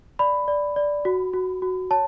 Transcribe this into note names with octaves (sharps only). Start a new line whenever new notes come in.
D5 B5
D5
D5
F#4
F#4
F#4
C#5 A5